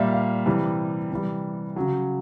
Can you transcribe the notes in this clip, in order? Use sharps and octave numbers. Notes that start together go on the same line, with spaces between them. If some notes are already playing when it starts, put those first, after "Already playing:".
Already playing: A#2 G3 E5 F5
F5
C3 E3 G3
C3 E3 G3
C#3 F#3